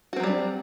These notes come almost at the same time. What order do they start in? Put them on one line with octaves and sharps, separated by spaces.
F#4 C4 F#3 G3 D4